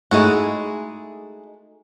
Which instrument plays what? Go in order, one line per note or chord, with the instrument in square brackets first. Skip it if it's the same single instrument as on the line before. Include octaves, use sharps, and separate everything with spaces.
[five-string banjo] G#3 E4 F#4 [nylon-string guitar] A3 D#4 G#4